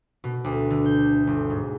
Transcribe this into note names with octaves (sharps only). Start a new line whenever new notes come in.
B2
D2
D3
G6
G1
G#2